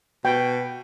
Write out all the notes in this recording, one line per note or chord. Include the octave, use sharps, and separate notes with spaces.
B2 G5